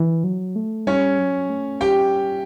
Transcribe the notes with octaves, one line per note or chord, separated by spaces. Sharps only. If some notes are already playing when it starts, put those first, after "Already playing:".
Already playing: E3
F#3
A3
G3 C#4 C#5
F#3
A3
G3 G4 G5